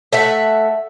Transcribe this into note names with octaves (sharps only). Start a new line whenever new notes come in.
A3 E5 F#5